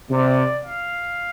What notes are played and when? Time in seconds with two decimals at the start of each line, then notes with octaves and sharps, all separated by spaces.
0.11 C3 D5
0.64 F5